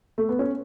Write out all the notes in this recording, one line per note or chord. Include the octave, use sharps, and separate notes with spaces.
A3
B3
C#4